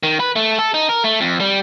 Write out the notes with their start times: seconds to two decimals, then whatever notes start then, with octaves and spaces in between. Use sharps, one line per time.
0.03 D#3
0.20 B4
0.36 A3
0.59 A4
0.74 D#4
0.89 A#4
1.04 A3
1.21 F2
1.40 G3